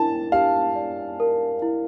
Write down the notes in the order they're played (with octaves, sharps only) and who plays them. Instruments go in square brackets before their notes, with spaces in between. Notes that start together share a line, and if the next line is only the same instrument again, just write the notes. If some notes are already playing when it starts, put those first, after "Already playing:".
Already playing: [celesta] E4 A#4 [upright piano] A5
[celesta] G4 [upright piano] F5
[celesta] D5
A#4
E4